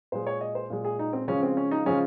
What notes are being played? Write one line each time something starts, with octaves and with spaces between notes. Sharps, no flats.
A#2 G#3 C5
C#5
D#5
C5
A#2 G#3
G#4
D#4
C4
C#3 F3 G#3 C#4
C4
C#4
D#4
C#3 F3 G#3 C#4